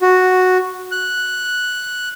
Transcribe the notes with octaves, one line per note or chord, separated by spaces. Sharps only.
F#4
F#6